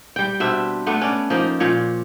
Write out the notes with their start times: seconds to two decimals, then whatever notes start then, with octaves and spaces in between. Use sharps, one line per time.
0.16 G3 G5
0.40 B2 C4 D4 E5
0.87 A3 B3 D4
1.01 C#4 D5
1.30 F3 A#3 D#4
1.60 A#2 F3 C#5 D5